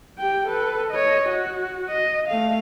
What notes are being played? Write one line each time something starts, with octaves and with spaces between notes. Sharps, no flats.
G4 G5
A4 B4
C#5 D#5
F#4
D#5
A3 F5